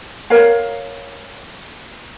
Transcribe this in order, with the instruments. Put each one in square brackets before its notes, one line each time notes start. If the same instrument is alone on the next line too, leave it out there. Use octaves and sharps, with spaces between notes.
[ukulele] A#4 C#5 F5